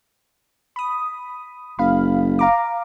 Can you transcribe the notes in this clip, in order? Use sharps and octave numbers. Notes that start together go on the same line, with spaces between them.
B5 D#6
F#1 F5 B5
F5 A#5 D6